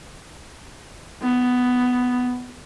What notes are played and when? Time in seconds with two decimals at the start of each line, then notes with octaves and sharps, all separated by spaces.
1.22 B3